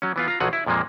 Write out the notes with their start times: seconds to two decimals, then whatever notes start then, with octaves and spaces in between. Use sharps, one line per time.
0.02 F#3 C#4
0.16 E3 B3 F4
0.28 F4 A#5
0.40 B1 F3 F#3 G#4 F#5
0.53 E4
0.66 F2 A#2 F3 G#3 A#3